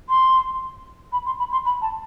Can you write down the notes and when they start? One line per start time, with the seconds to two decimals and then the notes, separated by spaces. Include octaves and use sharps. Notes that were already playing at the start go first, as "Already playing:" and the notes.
0.09 C6
1.12 B5
1.26 C6
1.39 B5
1.52 C6
1.65 B5
1.82 A5